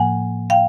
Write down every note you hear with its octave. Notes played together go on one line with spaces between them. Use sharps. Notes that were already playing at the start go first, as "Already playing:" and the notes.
Already playing: A2 F3 A#3 F#5 G#5
F5 G5